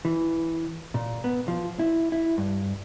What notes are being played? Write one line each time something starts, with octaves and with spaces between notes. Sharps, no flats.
E3
A#2
B3
F3
E4
E4
G2